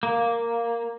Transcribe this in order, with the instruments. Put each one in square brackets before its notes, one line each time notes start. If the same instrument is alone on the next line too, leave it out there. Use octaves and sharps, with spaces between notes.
[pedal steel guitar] A#3